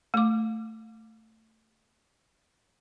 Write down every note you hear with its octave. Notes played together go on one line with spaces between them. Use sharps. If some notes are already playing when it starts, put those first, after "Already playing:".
A3 D6